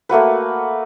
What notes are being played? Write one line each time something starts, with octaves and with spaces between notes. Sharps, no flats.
A3 A#3 F#4 B4